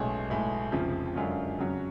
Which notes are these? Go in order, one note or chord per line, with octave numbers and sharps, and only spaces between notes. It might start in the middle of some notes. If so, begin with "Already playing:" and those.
Already playing: B1 A2 G#3 C#4 G#4
B1 A2 G#3
F1 F2 C#3 F3
F#2 D3 G#3 C#4 F4
F2 C#3 F#3 C#4